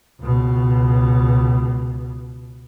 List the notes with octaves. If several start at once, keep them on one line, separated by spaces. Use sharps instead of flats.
C#2 B2